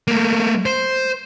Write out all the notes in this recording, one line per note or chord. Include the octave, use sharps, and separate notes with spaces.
A3 A#3
C5